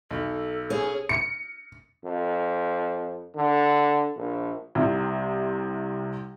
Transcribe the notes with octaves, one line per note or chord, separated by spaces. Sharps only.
B1 A4
C#4 G#4
C#7
F2
D3
A#1
C2 C3